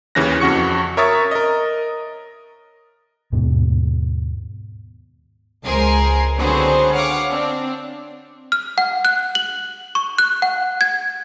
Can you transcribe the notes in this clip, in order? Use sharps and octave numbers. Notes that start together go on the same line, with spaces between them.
D#2 C#3 E3 C#4 F#6 A#6
F2 C#4 F#4 C#6 C#7
A#4 C#5 E5 C#6 D#6 A6
A#4 D#5
D#2 G#2 B2 B3
C#2 G#4 A#4 C5 G#5 C7
D3 F#3 B3 C4 G#4 C5
C#5 F5 F#5 C#6 D6
C4 D4
F6
F#5
F#6
F#7
C#6
F#6
F#5
G#6